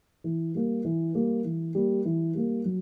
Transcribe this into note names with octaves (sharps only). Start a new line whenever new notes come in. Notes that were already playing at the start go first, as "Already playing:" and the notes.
E3
G3 A#3
E3
G3 A#3
E3
G3 A#3
E3
G3 A#3
F#3